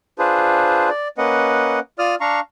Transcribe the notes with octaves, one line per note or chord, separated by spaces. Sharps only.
D4 F4 G#4 B4 C5
D5
A#3 C#4 B4 D#5 F#5
F4 D5 D#6 F6
D4 F5 A#5 C#6